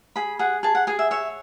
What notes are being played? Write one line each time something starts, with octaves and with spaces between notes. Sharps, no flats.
G#4 B5
G#4 F#5
G#4 A5
F#5
G#4 G#5
E5
C#5 E5